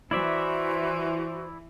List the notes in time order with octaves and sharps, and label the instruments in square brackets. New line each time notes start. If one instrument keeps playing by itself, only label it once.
[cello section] E3 [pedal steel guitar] E4 D5 E5 [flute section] F#4 C5